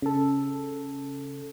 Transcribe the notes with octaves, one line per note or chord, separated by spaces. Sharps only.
C#3 A4